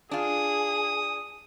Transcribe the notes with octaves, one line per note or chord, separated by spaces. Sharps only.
D4 F4 G#4 D#6